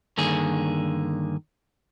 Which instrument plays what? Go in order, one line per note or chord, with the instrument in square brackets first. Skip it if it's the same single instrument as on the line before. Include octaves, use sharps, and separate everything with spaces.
[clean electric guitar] G2 D3 D#3 A#3 G#4